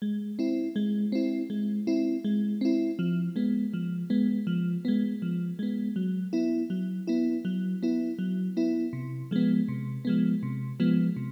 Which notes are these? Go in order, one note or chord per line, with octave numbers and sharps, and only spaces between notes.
G#3
C4 E4
G#3
C4 E4
G#3
C4 E4
G#3
C4 E4
F3
G#3 B3
F3
G#3 B3
F3
G#3 B3
F3
G#3 B3
F#3
B3 E4
F#3
B3 E4
F#3
B3 E4
F#3
B3 E4
C3
F3 G#3 B3
C3
F3 G#3 B3
C3
F3 G#3 B3
C3